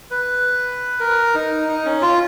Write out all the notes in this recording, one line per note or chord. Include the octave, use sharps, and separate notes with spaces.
B4
A#4
D#4
D#4
C#4
F4